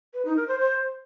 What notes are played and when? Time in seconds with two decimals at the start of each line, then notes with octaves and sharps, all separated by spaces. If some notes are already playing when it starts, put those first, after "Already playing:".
0.13 B4
0.25 D#4
0.36 A#4
0.47 C5
0.59 C5